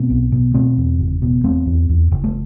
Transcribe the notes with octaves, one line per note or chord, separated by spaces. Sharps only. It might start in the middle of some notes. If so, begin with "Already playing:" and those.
Already playing: B2 A3 C4
B1
B2
B2 A3 C4
E2
F#1
B2
E2 A3 C4
E2
E2
F#1
A3